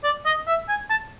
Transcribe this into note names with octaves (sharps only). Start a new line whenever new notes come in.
D5
D#5
E5
G#5
A5